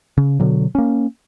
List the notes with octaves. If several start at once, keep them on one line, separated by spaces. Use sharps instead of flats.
C#3
B2 D3 F#3
A#3 C#4